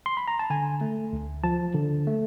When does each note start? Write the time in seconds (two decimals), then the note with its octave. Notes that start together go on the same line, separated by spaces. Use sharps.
0.06 C6
0.17 B5
0.28 A#5
0.39 A5
0.50 D3 G#5
0.81 A3
1.13 D2
1.44 F3 A5
1.74 D3
2.07 A3